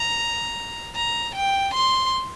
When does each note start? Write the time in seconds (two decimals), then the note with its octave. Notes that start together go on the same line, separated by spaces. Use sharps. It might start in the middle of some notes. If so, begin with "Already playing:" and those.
Already playing: A#5
0.96 A#5
1.35 G5
1.74 C6